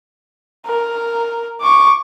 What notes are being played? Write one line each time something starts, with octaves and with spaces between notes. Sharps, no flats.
A#4
C#6 D6